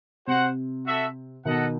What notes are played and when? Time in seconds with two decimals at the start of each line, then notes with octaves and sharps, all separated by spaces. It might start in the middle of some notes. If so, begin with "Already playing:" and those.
0.27 C3 F#4 C5 F#5
0.87 F#4 A4 E5
1.45 B2 D#3 A4 D#5 F#5